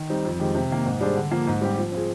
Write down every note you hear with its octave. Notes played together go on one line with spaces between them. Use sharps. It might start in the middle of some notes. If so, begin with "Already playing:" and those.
Already playing: D#3
G3 C4 D#4
F2
D#3 G#3 C4 G4
C3
D#3 A#3
G#2
G3 D4 G#4 C5
D3
F3 A#3
G#2
G3 C4 G4
F3
C4 F4 G#4